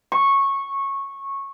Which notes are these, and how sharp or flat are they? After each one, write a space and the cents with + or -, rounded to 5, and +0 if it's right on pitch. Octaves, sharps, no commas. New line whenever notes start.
C#6 -15